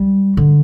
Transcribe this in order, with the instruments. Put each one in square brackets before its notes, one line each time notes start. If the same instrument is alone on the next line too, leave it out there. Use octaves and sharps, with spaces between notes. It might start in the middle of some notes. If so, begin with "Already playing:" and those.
Already playing: [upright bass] G3
D3